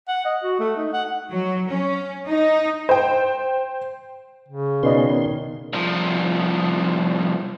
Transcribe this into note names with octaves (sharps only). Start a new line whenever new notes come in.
F#5
D#5
F#4
A3
D#4
F#5
F#3
C#4
D#4
C5 G5
C#3
B2 D#3 C#4 B4 D5 D#5 C6
C2 F3